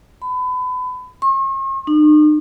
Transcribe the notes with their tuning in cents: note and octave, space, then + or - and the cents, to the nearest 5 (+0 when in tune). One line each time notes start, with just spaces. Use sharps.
B5 +30
C#6 -45
D#4 -45